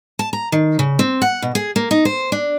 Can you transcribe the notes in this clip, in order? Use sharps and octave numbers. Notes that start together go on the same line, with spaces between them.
A5
A#5
D#3
C#3
C4
F#5
B2
G#4
A#3
D#4
C5
D4